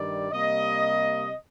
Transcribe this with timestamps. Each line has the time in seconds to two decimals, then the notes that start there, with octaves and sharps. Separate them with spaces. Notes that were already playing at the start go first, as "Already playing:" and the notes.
Already playing: G2 D#3 G3 D5
0.31 C3 G3 A#3 D#5